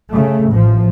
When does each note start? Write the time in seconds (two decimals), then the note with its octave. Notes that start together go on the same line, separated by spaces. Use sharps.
0.11 C#3 A3
0.49 A1 F3